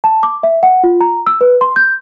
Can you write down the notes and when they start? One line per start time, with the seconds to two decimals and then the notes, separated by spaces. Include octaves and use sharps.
0.04 A5
0.23 D6
0.43 E5
0.63 F#5
0.84 F4
1.01 A#5
1.27 E6
1.41 B4
1.61 C6
1.76 G6